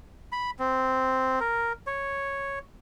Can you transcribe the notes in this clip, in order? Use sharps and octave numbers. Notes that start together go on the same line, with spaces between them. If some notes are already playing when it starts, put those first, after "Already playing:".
B5
C4
A#4
C#5